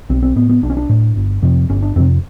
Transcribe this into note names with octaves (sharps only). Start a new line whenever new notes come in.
B1 C4
C4
A2 B3
B3
B1 D4
C#4
D4
A2
G1
F2 C3
G1 C#4
D4
F2 C3 C4